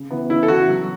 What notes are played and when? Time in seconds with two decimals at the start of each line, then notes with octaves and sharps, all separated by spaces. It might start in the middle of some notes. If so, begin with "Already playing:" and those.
Already playing: C#3
0.11 E3 B3
0.30 C#3 E4
0.43 A4
0.48 E3 B3 F#4
0.68 F#3